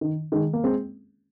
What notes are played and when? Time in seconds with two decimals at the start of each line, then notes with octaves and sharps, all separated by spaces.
0.01 D#3
0.32 D#3 G#3
0.53 A#3
0.64 G#3 C4